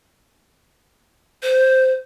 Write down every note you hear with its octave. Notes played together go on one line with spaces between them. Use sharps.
C5